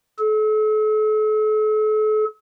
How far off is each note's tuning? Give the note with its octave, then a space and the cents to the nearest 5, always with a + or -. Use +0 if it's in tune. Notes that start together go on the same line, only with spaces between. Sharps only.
A4 -40